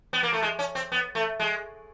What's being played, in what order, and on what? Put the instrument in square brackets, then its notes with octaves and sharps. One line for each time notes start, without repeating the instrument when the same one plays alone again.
[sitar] B3
A#3
A3
G#3
C#4
C4
B3
A3
G#3